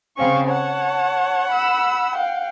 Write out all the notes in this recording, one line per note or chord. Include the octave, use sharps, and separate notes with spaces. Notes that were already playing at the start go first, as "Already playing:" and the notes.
C#3 C4 C#4 F5 C#6
C#5 F#5 A5
B5 E6
F5 G5